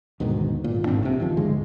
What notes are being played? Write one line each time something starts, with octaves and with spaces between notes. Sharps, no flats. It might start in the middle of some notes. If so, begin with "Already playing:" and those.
D2 G#2 B2 D#3
G#1 A#2
A1 G#2 C4 D4
C2 C3
F#1 D#3 F3
D1 G1 D2 G#3